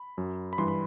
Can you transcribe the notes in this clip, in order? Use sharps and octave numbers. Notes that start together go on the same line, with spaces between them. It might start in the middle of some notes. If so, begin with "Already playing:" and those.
Already playing: B5
F#2 F#3
B5
G2 E3 G3 C6
B5